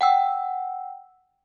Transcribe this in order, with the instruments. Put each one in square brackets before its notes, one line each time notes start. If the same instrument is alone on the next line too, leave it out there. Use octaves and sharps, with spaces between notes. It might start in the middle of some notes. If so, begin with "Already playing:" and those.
[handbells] F#5 G5 E6